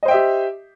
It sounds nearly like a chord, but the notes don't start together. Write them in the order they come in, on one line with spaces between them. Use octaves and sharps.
D#5 C5 G5 E5 G4